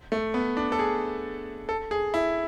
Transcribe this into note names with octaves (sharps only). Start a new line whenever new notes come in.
A3
B3
D4
A4
G#4
A4
G#4
E4